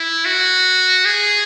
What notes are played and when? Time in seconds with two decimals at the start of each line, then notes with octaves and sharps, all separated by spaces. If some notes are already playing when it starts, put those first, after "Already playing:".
Already playing: E4
0.25 F#4
1.05 G#4